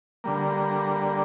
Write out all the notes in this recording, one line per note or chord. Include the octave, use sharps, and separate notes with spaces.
D3 G3 A#3